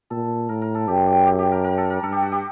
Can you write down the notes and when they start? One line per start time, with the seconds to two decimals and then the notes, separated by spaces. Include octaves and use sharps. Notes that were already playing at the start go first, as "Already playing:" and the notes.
0.10 A#2 A4
0.49 A2 A#4
0.62 A#4
0.75 A4
0.87 F#2 G4
1.07 G4
1.26 G4
1.39 G4
1.52 A#4
1.64 A#4
1.77 A4
1.90 A#4
2.03 G2 A4
2.12 G4
2.22 F#4
2.32 G4